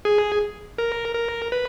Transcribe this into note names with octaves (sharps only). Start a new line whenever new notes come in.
G#4
A#4
A#4
B4